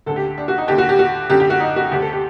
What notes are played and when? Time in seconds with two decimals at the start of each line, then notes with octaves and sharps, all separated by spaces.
0.06 D2 D3 A4
0.16 G4
0.38 D4
0.48 F#4
0.58 D#4
0.68 D#2 D3 G4
0.78 F#4
0.89 G4
0.99 F#4
1.30 F#2 D3 G4
1.40 G4
1.50 F#4
1.60 D#4
1.76 F#4
1.92 D2 D3 G4
2.02 A4
2.12 G4